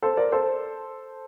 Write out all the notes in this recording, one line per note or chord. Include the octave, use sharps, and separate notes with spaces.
A4 C5
A#4 D5
A4 C5